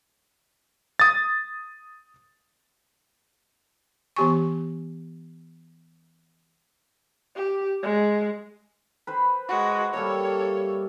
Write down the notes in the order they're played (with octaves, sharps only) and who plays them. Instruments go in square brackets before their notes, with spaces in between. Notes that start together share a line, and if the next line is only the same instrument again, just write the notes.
[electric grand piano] D#6 A6
[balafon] E3 B3 G4 G#5 C#6
[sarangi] G4
G#3
[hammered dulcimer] B4 C5 B5
[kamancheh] G#3 F#4
[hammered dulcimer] G3 A#3 E5 [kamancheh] A4 C#5